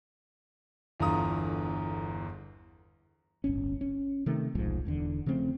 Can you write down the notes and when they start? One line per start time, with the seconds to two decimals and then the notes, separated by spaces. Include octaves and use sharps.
1.00 G1 E2 D3 F4 A#5 D#6
3.44 D1 G1 C#4
3.81 C#4
4.26 C3 D#3 A3
4.55 D#1 B1 G#2 F3
4.85 E1 E2 D3
5.26 C#3 F3 A3 C4